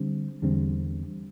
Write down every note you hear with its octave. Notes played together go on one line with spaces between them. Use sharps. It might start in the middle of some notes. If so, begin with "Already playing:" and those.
Already playing: D3 G3 C4
E2 D3 G3 C4